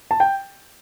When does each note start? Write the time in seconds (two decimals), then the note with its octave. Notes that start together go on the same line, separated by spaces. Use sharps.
0.11 A5
0.20 G5